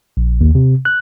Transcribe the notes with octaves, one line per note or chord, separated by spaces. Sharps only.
A#1
D#2
C3
F#6